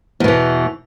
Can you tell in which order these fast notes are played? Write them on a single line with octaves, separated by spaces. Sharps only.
E2 B2 E3